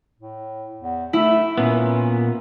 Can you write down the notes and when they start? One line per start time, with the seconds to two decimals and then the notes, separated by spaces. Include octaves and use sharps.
0.19 A2
0.81 E2
1.13 A3 E4
1.58 A#2 B3 C#4